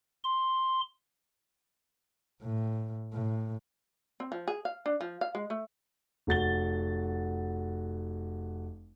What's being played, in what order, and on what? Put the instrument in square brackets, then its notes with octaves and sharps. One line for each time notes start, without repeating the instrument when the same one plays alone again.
[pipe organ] C6
[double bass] A2
A2
[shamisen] C4
F3
G#4
F5
D4
F3
F5
G#3
A3
[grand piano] F1 F#4 A6 G7